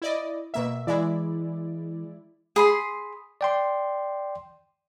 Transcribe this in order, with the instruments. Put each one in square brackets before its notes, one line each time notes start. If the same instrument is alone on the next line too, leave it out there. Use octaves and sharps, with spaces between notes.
[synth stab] E4 D5 D#5
B2 A#3 E5
[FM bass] E3 [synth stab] G#3 E4 D5
[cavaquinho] G#4 B5 C6
[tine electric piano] D5 G5 C6